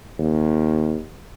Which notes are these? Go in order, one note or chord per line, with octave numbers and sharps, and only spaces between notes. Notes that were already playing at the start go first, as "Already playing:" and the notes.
D#2